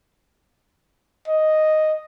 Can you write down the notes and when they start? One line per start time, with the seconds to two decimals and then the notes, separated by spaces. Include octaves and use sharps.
1.28 D#5